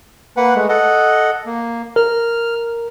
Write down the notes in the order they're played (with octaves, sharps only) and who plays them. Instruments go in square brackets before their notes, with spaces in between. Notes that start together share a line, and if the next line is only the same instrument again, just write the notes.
[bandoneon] A#3 B4 F#5
G#3 A3
A4 D#5 F#5
A#3
[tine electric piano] A#4 [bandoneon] F6